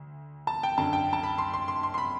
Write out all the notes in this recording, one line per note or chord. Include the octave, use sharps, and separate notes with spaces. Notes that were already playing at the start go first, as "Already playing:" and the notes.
Already playing: D2
A5
G5
F#2 D3 A5
G5
A5
B5
C6
C6
C6
C6
C6
B5